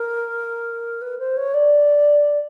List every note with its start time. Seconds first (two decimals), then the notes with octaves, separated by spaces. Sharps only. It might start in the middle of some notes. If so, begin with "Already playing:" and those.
Already playing: A#4
1.01 B4
1.19 C5
1.37 C#5
1.54 D5